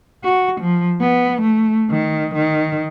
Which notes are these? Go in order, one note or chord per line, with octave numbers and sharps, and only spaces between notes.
F#4
F3
B3
A3
D#3
D#3